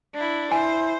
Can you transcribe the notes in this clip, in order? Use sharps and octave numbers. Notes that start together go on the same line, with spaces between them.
D4 E4
E4 C5 G#5